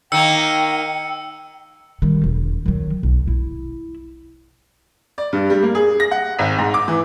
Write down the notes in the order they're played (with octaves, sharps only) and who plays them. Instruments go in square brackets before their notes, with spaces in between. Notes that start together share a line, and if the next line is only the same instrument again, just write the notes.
[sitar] D#3 A#3 [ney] G5 [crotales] E6 C#7
[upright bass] D#3 G3
E1
D#3 F#3
B1
E4
[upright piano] D5
G2
G3
A#3
G#4
A#6
F#5
G#1
G#2
D6
E3